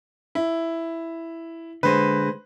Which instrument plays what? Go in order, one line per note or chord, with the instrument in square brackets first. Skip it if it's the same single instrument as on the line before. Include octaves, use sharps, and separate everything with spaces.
[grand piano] E4
[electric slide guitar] D3 G#3 [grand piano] B4 C5